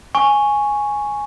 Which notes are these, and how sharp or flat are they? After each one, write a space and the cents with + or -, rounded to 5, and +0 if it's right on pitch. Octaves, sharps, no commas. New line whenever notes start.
G#5 +0 C#6 +0